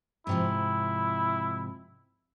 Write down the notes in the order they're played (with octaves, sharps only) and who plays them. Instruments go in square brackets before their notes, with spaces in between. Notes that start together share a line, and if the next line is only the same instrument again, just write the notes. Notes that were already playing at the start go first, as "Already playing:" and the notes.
[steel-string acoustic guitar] G#2 C3 F3 [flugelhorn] E4